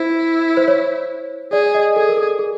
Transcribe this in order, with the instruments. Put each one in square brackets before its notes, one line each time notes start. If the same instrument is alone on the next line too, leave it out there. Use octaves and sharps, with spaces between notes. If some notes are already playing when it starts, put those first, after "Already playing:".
Already playing: [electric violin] E4 [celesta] C5
[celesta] C5
C#5
[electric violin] G#4 [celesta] D5
[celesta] D#5
[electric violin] G#4 [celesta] A4
[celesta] A#4
A4
G#4